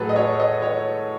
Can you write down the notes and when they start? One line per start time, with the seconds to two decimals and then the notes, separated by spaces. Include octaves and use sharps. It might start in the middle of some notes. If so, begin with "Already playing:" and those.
Already playing: A2 F#3 A3 F#4 G#4 A4 B4
0.09 D#5
0.16 C#5
0.40 D#5
0.62 C#5